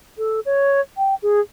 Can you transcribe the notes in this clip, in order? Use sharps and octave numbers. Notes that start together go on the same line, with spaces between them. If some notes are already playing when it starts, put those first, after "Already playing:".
A4
C#5
G5
G#4